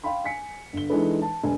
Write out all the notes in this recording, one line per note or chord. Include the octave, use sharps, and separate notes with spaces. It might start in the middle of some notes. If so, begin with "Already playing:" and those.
F5 G5 B5 C6
G#5 B6 C#7
G1 G7
E3 G#3 D4 D#4 A4 B4
A5
E1 G#5